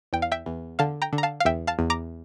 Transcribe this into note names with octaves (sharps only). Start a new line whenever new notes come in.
E2 G5
F5
E5 G5
E2
D3 F5 A5
G5 A#5
D3
A#5
F5 A5
F5
E2 E5 G5
F5 A5
E2
A#5 D6